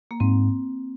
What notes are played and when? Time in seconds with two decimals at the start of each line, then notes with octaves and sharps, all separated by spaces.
0.11 A#3
0.20 G#2 C4